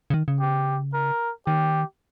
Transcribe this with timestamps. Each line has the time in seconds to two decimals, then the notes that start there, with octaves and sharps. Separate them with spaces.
0.10 C#3
0.14 D#3
0.28 C#3
0.40 G4
0.94 A#4
1.47 D#3 G4